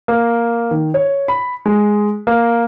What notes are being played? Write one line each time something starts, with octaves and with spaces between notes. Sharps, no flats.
A#3
D#3
C#5
B5
G#3
A#3